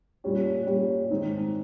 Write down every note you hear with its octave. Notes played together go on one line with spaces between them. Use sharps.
A#2 G3 C#4 G4
A#2 G3 C#4 G4
G#2 D#3 G#3 C4 D#4